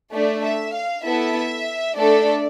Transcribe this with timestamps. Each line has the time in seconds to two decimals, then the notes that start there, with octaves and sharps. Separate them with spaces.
0.12 A3 D4 A4 D5
0.43 E5
0.74 F5
1.04 B3 E4 A4 E5
1.96 A3 D4 A4 D5